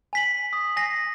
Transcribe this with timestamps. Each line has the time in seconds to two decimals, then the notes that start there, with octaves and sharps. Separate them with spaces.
0.13 G#5 B6 F#7
0.53 D#6
0.76 G#5 A#6 C7